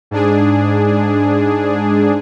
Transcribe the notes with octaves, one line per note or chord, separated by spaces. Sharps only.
G#2 D4 G#4